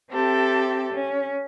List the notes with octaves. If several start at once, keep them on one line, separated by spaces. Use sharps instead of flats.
C4 G4 A4 E5
C#4